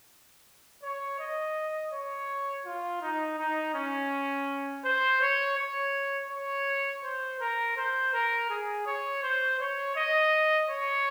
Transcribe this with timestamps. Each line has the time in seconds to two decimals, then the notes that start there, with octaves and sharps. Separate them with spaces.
0.83 C#5
1.19 D#5
1.92 C#5
2.66 F4
3.02 D#4
3.38 D#4
3.75 C#4
4.85 C5
5.21 C#5
5.58 C#5
6.30 C#5
7.04 C5
7.40 A#4
7.77 C5
8.13 A#4
8.50 G#4
8.86 C#5
9.23 C5
9.60 C#5
9.96 D#5
10.69 C#5